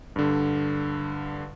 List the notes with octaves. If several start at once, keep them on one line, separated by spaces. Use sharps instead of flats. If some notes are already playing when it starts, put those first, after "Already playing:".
G2 D3